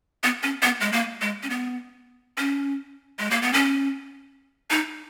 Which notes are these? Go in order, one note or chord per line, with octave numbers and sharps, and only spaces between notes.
B3
C#4
B3
G#3
A#3
G#3
C#4
B3
C#4
G#3
A#3
B3
C#4
D#4